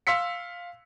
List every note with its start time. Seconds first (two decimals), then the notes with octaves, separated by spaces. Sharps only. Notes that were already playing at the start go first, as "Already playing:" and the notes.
0.07 F5 C6 E6 B6 C#7